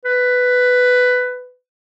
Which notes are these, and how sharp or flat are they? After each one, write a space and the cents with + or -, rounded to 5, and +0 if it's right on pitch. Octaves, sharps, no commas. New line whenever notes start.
B4 +10